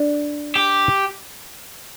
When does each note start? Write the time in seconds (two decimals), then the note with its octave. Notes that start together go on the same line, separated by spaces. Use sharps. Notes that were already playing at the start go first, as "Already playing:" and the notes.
Already playing: D4
0.56 G4